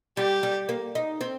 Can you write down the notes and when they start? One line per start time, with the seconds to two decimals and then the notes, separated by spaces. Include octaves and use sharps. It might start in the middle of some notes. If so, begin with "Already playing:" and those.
0.17 G3 G4
0.43 G3
0.69 A#3
0.95 D#4
1.21 C4